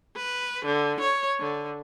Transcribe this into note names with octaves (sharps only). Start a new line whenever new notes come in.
B4
D3
C#5
D3